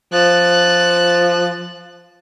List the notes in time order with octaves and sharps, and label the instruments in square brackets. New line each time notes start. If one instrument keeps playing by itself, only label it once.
[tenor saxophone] F3 [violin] F#6 A6